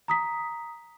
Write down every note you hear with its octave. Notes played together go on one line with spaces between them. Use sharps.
A#5 D#6 B6